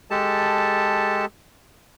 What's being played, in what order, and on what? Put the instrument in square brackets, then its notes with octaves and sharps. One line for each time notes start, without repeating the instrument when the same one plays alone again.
[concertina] G#3 G4 A4 A5